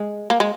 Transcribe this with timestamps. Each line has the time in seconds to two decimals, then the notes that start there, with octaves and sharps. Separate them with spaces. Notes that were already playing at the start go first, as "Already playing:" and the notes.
Already playing: G#3
0.30 A#3
0.40 G#3